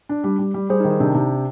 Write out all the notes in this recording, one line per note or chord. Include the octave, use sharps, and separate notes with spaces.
D4
G3
G3
G3
G3 G#4 C5
D#4
D#3
D#4
C3 D4
C3